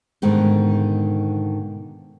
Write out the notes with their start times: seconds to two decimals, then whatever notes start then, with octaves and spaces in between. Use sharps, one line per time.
0.22 G#2 B2 D3 D#3 G#3